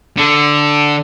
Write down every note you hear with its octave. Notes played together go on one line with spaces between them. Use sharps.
D3